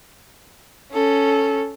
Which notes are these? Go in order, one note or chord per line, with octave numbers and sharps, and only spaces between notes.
C#4 A4